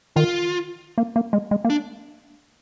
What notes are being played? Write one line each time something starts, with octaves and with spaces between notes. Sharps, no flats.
D#3 F4
A#3
A#3
G#3
G#3
A#3
D4